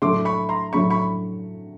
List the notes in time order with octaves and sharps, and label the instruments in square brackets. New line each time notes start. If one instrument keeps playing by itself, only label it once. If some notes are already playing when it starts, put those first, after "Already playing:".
[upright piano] A2 F#3 A3 D4 [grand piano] C6 D6
[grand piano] B5 C#6
A#5 C6
[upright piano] A2 F#3 A3 D4 [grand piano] B5 C#6
[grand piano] B5 C#6